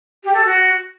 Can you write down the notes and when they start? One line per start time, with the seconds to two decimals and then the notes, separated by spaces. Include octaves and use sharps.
0.24 G4
0.35 A4
0.45 F#4